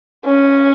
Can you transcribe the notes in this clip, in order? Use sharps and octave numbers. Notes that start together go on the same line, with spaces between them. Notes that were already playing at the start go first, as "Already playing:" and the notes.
C#4